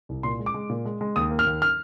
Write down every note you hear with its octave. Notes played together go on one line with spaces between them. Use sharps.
C2
A#2 C6
G#3
D6
G#3
A#2
G#3
G#3
D#2 D#6
A#3
F6
D#2
F6